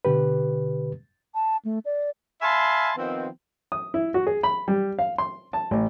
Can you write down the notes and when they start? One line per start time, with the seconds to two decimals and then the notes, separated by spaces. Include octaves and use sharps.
0.05 B2 D3 G4 B4
1.34 A5
1.65 A3
1.85 D5
2.42 E5 F5 G#5 A5 B5 C6
2.97 D#3 F3 B3 C4
3.72 D#6
3.94 E4
4.14 F#4
4.27 G#4
4.43 B5
4.68 G3
4.99 F5
5.18 C6
5.53 A5
5.71 A1